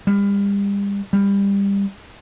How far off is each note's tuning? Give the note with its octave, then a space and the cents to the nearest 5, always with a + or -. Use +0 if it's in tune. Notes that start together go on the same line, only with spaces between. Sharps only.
G3 +35
G3 +25